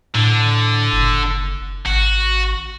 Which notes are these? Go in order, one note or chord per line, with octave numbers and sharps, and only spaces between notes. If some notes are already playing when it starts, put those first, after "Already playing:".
A2 D3
F#1
G#1 F#4